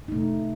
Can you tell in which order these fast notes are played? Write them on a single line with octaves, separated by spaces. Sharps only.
D#4 A3 C3